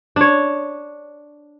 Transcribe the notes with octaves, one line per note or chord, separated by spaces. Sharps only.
D4 C#5